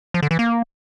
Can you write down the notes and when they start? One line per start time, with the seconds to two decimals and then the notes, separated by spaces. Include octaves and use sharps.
0.14 F3
0.23 D3
0.31 E3
0.39 A#3